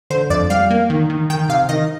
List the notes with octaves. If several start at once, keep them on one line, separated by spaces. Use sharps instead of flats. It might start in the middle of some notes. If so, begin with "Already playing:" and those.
D3 C5
F2 D5
G3 F5
A#3
D#3
D#3
D#3 G5
C3 F5
D#3 D#5